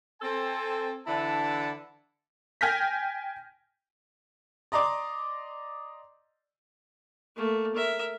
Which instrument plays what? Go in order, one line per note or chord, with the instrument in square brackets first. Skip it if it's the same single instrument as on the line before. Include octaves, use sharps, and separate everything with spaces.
[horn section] C4 A4 G#5
D3 E3 D4 E4 A5
[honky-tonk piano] G5 G#5 F6 G6 A#6 B6
[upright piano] D5 D#5 A#5 C6 D6 D#6
[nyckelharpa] A3 A#3
A#4 E5